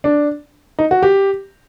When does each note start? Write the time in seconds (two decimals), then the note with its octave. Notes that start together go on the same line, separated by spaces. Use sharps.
0.04 D4
0.79 D#4
0.91 F#4
1.03 G4